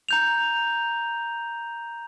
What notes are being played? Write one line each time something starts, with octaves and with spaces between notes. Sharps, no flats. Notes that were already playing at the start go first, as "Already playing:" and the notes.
A#5 G6 F7